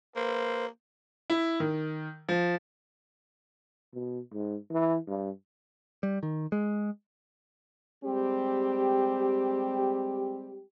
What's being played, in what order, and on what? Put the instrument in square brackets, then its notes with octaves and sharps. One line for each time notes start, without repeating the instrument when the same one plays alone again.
[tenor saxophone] A#3 [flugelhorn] B4 [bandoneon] C5
[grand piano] E4
D#3
F3
[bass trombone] B2
G#2
E3
G2
[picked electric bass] G3
D#3
G#3
[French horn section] G3 G#3 C4 G4